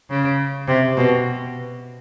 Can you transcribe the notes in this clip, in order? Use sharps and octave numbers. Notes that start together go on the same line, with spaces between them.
C#3
C3
B2